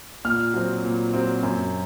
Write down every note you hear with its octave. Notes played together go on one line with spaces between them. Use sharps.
A#2 F6
F#3 C4
A#2
F#3 C4
F#2